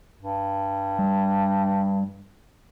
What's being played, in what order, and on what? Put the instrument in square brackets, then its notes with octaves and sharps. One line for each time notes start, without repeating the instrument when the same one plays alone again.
[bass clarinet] G2
[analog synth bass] G3